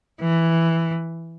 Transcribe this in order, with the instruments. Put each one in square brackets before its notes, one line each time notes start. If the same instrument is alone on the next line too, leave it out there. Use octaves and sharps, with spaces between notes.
[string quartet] E3